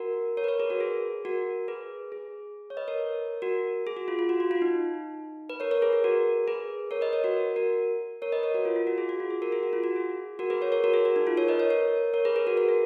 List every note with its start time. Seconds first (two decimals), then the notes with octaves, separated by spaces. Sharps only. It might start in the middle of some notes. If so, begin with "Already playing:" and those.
Already playing: F#4 A#4
0.37 A#4 C#5
0.44 B4
0.48 A#4 C#5
0.60 G#4 B4
0.70 F#4 A#4
0.80 G#4
1.25 F#4 A#4
1.68 G#4 B4
2.12 G#4
2.70 C#5
2.77 B4 D#5
2.88 A#4 C#5
3.42 F#4 A#4
3.87 G#4
3.97 F#4
4.08 F4
4.19 F4
4.29 F#4
4.40 F#4
4.51 F4
4.62 D#4
5.50 B4
5.60 A#4 C#5
5.71 A#4 C#5
5.82 G#4 B4
5.93 G#4
6.04 F#4 A#4
6.48 G#4 B4
6.91 A#4 C#5
7.01 B4 D#5
7.13 A#4 C#5
7.24 F#4 A#4
7.56 F#4 A#4
8.22 A#4 C#5
8.32 B4 D#5
8.43 A#4 C#5
8.54 F#4 A#4
8.65 F4
8.76 F4
8.87 F#4
8.98 G#4
9.09 F#4
9.20 F4
9.31 G#4
9.42 F#4 A#4
9.52 G#4
9.63 F#4
9.73 F4
9.84 F#4
9.96 G#4
10.39 F#4 A#4
10.50 G#4 B4
10.61 A#4 C#5
10.72 A#4 C#5
10.84 F#4 A#4
10.93 G#4
11.05 F#4
11.16 D#4
11.27 F4
11.37 A#4 C#5
11.48 B4 D#5
11.60 A#4 C#5
11.70 A#4 C#5
12.14 A#4 C#5
12.25 G#4 B4
12.36 G#4 B4
12.47 F#4 A#4
12.57 F#4 A#4
12.68 G#4